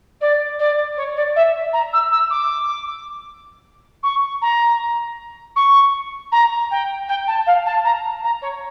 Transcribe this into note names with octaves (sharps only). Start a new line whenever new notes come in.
D5
D5
C#5
D5
E5
A#5
E6
E6
D6
C#6
A#5
C#6
A#5
G5
G5
A5
F5
A5
A#5
A#5
C#5